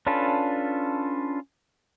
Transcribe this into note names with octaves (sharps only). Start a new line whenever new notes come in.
C#4 D4 F4 A4 B4